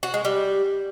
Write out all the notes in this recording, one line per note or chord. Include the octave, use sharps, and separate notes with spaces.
F#4
G#3
G3